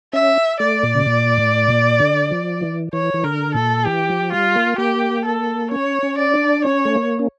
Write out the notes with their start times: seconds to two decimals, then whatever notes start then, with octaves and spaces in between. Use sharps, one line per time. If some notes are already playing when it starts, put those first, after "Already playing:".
0.13 C#4 E5
0.60 A3 D5
0.83 A#2
0.95 C#3
1.06 A#2
1.38 A2
1.68 A#2
2.00 D3
2.31 F3
2.61 E3
2.93 E3 C#5
3.14 E3
3.24 D3 A#4
3.55 A#2 A4
3.86 E3 G4
4.10 F3
4.32 G3 F4
4.55 A#3
4.78 A#3 G4
5.25 A4
5.71 C#4 C#5
6.03 C#4
6.18 D5
6.34 D4
6.65 C#4 C#5
6.85 A3
6.96 A#3
7.19 C#4